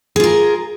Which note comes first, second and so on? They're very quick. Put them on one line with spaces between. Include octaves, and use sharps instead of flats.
G#4 F4 A#4